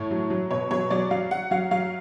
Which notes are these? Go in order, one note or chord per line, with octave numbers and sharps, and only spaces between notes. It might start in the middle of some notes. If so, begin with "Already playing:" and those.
Already playing: A2 C#5
F#3
F#3
B2 C#5
F#3 C#5
F#3 D5
F#3 F5
F#3 F#5
F#3 F5
F#3 F5